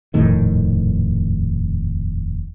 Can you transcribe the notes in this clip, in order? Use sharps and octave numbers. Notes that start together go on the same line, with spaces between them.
D#1 F2 A2 D#3